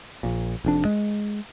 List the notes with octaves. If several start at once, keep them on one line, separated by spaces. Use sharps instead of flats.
A#1 A#2
F1 F2 D4
G#3